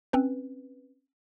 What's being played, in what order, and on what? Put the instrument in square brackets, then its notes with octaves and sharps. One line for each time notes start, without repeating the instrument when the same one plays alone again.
[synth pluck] C4 C#4 B4